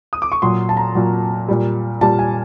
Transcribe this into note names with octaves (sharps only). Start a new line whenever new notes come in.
D#6
D6
C#6
A#2 F#3 C6
A5
A#5
A#2 F#3
A#2 G3
A#2 G3 A5
G#5